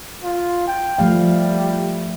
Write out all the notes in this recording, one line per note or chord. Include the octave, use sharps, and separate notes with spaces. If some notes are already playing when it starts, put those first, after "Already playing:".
F4
G5
F3 G3 A3 F5